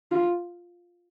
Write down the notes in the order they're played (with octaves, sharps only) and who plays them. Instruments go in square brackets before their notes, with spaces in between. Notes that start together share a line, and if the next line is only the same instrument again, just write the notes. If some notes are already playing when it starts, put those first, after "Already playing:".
[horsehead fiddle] F4